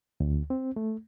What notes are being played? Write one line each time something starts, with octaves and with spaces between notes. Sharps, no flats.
D2
C4
A3